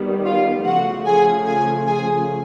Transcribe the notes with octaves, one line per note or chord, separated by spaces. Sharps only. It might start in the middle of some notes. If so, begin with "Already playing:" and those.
Already playing: D#3 G3 B3
F4 F5
C#3 F3 A3 F#4 F#5
G#4 G#5
G#4 G#5
G#4 G#5